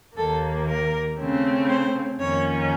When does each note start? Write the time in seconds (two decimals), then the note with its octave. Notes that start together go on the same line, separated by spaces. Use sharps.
0.16 D#2 D#3 A#3 A4
0.67 A#4
1.18 C#3 A3 C4
1.69 C5
2.19 F2 D#3 A#3 C#4 C#5